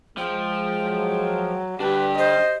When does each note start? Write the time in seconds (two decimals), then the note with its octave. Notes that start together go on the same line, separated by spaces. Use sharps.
0.17 F3 G#3 G5
0.84 F#3
1.80 D3 G3 D4 G4 B4 G5
2.18 C5 D#5